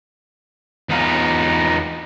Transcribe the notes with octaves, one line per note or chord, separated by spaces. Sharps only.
E2 B3 D#4 F4